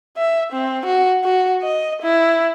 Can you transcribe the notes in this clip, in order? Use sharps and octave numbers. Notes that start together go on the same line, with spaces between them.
E5
C4
F#4
F#4
D#5
E4